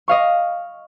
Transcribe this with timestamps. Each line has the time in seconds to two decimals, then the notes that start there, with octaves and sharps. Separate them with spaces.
0.08 D#5 F5 C#6